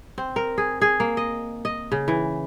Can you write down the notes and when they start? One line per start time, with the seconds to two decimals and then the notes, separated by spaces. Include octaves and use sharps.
0.18 C4
0.36 A#4
0.58 G#4
0.81 G#4
1.00 A#3
1.17 D#5
1.65 D#5
1.92 C#3
2.08 E3